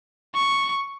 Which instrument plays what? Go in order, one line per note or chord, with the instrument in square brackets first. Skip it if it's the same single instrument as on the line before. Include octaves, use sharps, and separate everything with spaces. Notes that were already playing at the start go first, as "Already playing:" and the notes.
[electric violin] C#6